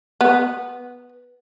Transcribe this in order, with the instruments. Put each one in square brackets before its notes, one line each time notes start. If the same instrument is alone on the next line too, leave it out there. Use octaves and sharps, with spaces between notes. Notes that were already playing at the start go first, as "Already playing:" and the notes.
[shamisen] B3